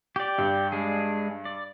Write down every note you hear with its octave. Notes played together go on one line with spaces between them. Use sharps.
G4 D5
G2
G#3 D4 G#4
D5